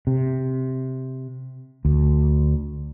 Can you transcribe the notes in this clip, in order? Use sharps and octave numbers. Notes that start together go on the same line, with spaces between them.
C3
D2